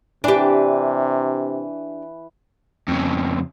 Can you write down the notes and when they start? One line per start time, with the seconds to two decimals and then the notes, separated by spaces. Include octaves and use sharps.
0.24 C3 E3 D4 G4 B4
2.88 F2 C#3